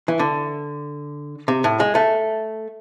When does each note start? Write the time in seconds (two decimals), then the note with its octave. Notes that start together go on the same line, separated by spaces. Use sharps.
0.08 E3
0.19 D3
1.48 C3
1.64 A2
1.80 G#3
1.95 A3